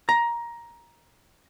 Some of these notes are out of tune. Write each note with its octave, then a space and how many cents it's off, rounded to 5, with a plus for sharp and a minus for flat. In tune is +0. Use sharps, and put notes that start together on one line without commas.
A#5 +15